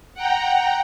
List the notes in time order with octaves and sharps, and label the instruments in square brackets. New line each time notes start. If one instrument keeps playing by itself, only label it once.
[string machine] F#5 G5 A#5